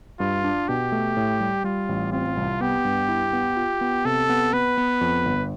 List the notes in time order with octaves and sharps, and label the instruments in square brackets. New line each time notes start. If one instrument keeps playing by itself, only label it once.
[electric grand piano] G2 [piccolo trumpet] F4
[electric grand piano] D4
[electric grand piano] B2 [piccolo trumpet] G4
[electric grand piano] A3
A2
G3
[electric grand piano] G3 [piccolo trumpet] F4
[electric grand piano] A1
[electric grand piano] C4 [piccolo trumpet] F4
[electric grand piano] C2
[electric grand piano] B3 [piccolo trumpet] G4
[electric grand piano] G2
E4
B3
F4
B3
[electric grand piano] C3 [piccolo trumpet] A4
[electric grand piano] B3
[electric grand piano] B3 [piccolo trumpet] B4
[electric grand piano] B3
F2
G1